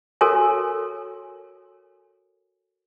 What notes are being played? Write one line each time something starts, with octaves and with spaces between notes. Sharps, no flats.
F#4 A4 A#4 C#5 G#5